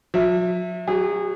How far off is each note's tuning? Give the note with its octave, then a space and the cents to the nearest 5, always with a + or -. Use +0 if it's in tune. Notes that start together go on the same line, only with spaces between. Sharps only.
F#3 -45 E5 +0
F#3 +15 G#4 -30